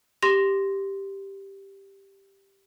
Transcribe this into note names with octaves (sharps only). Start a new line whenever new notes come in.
G4 C6 A#6 F7